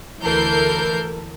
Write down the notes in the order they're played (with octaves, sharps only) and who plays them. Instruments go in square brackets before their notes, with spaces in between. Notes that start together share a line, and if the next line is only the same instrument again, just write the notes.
[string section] D2 E3 A4 A#4 G6 C7